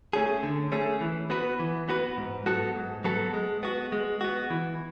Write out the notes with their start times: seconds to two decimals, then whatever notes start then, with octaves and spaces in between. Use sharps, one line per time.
0.13 A3 C#4 G#4
0.43 D3
0.72 A3 C#4 G#4
1.01 E3
1.30 B3 F#4 B4
1.59 E3
1.89 B3 F#4 B4
2.17 G#2
2.46 F#3 B3 F#4 A4
2.75 G#2
3.04 F#3 B3 F#4 A4
3.34 G#3
3.63 B3 F#4
3.92 G#3
4.21 B3 F#4
4.50 E3